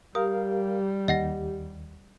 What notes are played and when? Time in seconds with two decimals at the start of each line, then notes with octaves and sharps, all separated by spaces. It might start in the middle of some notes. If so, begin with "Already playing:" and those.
0.15 G3 G4 A#4 F5 D#6
1.08 D#2 D#5 F#5 A#6